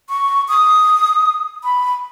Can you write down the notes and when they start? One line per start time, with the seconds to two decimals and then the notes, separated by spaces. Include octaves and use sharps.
0.09 C#6
0.48 D#6
1.64 B5